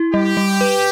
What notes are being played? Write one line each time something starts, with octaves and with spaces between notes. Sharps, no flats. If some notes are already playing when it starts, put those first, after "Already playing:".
Already playing: E4
G3 G4
G3
B4